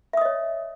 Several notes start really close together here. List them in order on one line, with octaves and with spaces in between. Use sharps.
E5 D#6 D#5 C#5